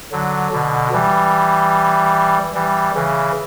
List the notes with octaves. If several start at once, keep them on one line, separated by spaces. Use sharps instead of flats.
D3 F#3
B2 D3
E3 G3
E3 G3
C#3 E3